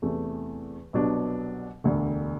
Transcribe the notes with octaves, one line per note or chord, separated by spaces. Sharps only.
E2 C3 E3 A3
C2 B2 F#3 B3 D4
E1 D2 D3